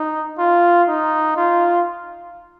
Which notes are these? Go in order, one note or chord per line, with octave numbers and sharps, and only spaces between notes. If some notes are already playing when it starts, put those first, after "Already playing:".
Already playing: D#4
F4
D#4
F4